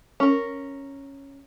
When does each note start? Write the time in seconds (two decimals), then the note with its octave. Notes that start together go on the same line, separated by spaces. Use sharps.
0.20 C#4 A#4